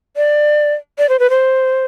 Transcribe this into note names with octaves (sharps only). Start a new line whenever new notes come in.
D5
D5
C5
B4
C5